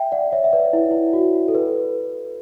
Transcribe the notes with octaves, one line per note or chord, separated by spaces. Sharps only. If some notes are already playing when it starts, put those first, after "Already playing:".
Already playing: E5 G5
D5 F#5
C#5 E5
E5
B4 D5
E4
E4
F#4
A4
B4